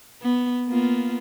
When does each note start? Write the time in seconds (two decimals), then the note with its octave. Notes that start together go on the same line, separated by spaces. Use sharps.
0.22 B3
0.68 A#3 B3 F4